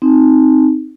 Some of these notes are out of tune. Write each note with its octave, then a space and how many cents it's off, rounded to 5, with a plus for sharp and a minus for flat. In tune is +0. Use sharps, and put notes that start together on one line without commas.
C4 +0 D#4 +0